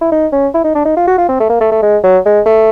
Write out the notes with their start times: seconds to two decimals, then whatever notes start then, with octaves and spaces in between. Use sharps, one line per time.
0.01 E4
0.12 D#4
0.33 C#4
0.54 E4
0.64 D#4
0.75 D4
0.85 D#4
0.97 F4
1.08 F#4
1.18 F4
1.29 C4
1.40 A3
1.50 A#3
1.61 A3
1.72 A3
1.82 G#3
2.03 F#3
2.26 G#3
2.46 A3